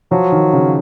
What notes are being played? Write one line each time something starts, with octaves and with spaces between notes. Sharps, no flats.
F3 F#3
D#3
C#3